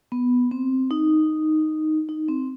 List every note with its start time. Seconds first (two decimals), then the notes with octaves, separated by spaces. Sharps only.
0.12 B3
0.51 C4
0.91 D#4
2.09 D#4
2.28 C4